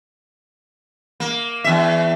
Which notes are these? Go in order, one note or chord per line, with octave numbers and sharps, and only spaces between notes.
A#3
E2 E5